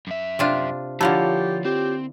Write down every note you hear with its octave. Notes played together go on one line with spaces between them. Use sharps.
F#2 E5
C3 D4 F4
D3 F3 A#3 E4 F4 G4 C#5 A5
C4 G4